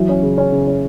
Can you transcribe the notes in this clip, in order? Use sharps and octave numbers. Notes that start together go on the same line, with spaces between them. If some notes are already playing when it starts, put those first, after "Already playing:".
Already playing: E3 F#3
C#4
C#3
C#4
C#3
C#4